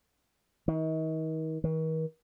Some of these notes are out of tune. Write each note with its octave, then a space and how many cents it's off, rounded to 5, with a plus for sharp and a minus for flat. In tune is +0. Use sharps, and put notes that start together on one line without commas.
D#3 +40
D#3 +45